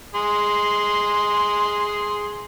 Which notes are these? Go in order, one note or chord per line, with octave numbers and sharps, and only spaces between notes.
G#4 C6